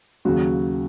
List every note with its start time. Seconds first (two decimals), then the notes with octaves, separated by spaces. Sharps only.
0.25 D#2 C#3 F#3 F#4